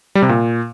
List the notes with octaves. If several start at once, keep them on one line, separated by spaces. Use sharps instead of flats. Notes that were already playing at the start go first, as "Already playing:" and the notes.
G3
C3
A#2